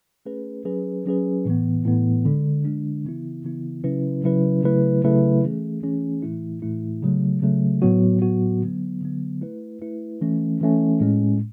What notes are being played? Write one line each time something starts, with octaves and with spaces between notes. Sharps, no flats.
A3 C#4 G#4 B4
F#3 C#4 G#4 B4
F#3 C#4 G#4 B4
A2 E3 B3
A2 E3 B3
D3 G#3 D4
D3 G#3 D4
C#3 E3 B3 E4
C#3 E3 B3 E4
C#3 F#3 C#4 E4 B4
C#3 F#3 C#4 E4 B4
C#3 F#3 A3 E4 B4
C#3 F#3 A3 E4 B4
E3 A3 C#4 G#4
E3 A3 C#4 G#4
A2 E3 A3 E4
A2 E3 A3 E4
C#3 F#3 A3
C#3 F#3 A3
A2 F#3 B3 F#4
A2 F#3 B3 F#4
D3 F#3 B3
D3 F#3 B3
A3 E4 B4
A3 E4 B4
E3 A3 C#4
E3 A3 C#4
A2 G#3 C#4